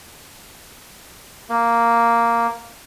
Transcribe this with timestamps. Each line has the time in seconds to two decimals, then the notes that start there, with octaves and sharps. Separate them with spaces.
1.49 A#3